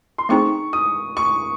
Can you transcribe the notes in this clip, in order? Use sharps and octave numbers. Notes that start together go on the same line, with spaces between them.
C6
A3 C4 D#4 G#4 C#6
D#6
C#6